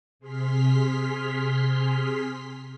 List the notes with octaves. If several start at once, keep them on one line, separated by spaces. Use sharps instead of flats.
C3 G#4 C6 F6 B6